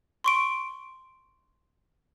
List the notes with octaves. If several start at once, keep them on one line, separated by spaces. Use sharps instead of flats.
C6 C#6 D7